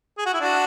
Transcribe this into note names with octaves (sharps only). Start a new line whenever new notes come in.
G#4
F#4
E4
D4 F#4